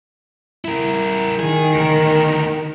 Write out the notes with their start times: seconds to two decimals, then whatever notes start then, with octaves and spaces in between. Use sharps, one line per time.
0.65 E4 A#4
1.39 D#3 G#4
1.75 D2 A#4